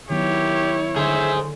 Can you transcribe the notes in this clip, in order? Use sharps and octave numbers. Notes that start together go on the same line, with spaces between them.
D#3 F#3 B3 E4 G4 C#5
D3 G#4 C5 E5